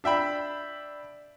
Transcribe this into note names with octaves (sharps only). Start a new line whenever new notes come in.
D4 E5 G5 B5